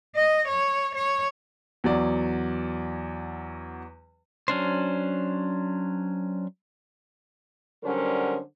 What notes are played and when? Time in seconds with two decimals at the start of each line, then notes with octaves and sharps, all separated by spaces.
0.15 D#5
0.47 C#5
0.95 C#5
1.84 E2 F#3 D5
4.48 F#3 C#4 D4 C5
7.84 D3 F#3 G3 C#4 A#4 C5